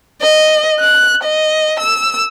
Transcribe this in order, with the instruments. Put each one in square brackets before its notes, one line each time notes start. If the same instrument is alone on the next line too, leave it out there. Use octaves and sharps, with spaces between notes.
[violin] D#5
F#6
D#5
E6